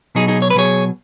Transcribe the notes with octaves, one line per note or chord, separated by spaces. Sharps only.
B2 F#3 D#4 G#4
D#4 G#4
C#5
B4
B2 F#3 G#4 C#5